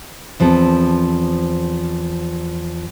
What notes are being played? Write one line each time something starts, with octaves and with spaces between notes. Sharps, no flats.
E2 F3 C4 A4